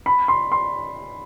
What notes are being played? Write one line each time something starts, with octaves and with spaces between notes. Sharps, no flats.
B5
C6
C6